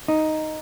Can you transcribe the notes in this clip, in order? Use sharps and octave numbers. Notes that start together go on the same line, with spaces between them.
D#4